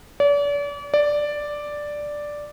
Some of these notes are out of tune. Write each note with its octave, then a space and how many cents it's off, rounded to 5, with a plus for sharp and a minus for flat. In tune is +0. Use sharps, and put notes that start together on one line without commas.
D5 -40
D5 +0